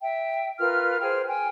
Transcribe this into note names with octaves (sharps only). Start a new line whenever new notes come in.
E5 G5
F4 A#4 B4 F6
G#4 C5 G5 F6
G5 G#5